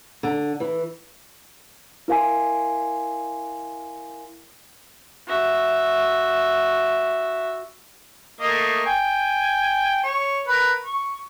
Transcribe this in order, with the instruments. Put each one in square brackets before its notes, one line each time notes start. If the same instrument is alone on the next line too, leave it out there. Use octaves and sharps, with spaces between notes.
[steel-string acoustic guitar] D3
E3
[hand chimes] E4 A#4 F5 G#5 C6
[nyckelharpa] F#4 E5
[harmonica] A3 A#3 D#5
G5 G#5
C#5
A#4 B4
C#6